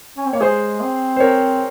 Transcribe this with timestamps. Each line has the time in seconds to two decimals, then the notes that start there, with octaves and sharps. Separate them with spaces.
0.17 C#4
0.25 C4
0.33 A#3 C#5
0.41 G#3 G#4 C5
0.81 C4
1.16 C5
1.20 C4 A#4 C#5